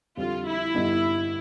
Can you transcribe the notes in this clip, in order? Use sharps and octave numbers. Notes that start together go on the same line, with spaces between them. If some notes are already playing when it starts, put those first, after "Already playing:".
F2 D3 G3 F4
E4
G2 D3 G3 B3 D#4